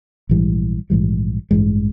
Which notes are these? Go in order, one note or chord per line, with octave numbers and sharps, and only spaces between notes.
A#1 G#2 E3 G3
A#1 G#2 E3 G3
A1 G2 E3 G#3